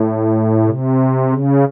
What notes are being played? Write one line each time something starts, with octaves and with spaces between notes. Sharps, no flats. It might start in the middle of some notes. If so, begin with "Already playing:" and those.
Already playing: A2
C3
C#3